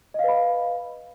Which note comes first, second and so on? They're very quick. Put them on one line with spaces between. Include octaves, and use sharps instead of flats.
D#5 F5 B4 B5